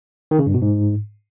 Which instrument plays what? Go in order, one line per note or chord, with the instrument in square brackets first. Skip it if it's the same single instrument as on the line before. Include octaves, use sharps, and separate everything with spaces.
[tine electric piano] D#3
C#3
G2
B2
G#2